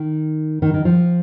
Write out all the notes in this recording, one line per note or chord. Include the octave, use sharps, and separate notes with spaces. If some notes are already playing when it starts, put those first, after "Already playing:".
Already playing: D#3
D#3
D#3
F3